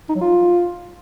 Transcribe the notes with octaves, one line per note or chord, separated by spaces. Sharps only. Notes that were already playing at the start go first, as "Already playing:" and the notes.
D#4
F#3
F4